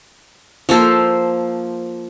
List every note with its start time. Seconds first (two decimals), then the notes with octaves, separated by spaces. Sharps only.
0.69 F3 A#3 A4 C5